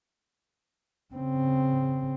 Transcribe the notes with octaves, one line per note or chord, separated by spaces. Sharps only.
C#3 C4